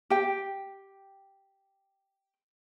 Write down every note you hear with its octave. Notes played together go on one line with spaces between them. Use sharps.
G4 G5